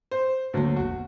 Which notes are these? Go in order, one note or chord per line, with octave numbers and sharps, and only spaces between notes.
C5
D2 D3 F#3 A#3
E1 A#1 F#4